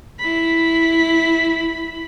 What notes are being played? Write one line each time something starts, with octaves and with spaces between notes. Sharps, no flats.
E4 B5